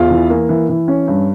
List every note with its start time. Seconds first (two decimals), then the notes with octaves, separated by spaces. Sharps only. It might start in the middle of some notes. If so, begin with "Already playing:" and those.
Already playing: E2 F4 F5
0.10 E3
0.30 A#3
0.49 E3
0.69 E3
0.88 C#4
1.08 G2